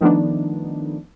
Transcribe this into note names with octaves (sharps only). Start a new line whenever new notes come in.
D#3 F3 A3 B3 D4 D#4